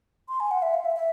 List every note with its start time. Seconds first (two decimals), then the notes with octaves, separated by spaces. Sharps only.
0.29 C6
0.40 G#5
0.51 F#5
0.62 E5
0.74 F5
0.85 E5
0.96 E5